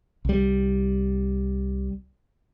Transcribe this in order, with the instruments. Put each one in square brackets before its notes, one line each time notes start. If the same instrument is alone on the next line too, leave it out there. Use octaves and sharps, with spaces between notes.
[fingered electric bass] C2 G3